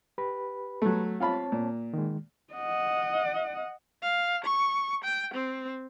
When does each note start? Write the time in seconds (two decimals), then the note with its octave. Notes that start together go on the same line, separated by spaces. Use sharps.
0.18 G4 B4 B5
0.82 F#3 A3
1.20 C4 F4 C#5 F5 A5 B5
1.52 A#2
1.93 D#3 G#3
2.54 D#5 F#5
4.02 F5
4.44 C#6
5.04 G5
5.34 C4